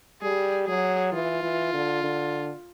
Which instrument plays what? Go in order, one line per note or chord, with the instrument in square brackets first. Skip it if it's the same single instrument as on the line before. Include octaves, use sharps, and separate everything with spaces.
[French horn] G3 [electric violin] G#4
[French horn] F#3 [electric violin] G#4
[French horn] E3 [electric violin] F4
[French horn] E3
D3
D3